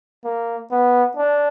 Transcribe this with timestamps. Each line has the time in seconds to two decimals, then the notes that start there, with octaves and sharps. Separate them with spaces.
0.25 A#3
0.71 B3
1.17 D4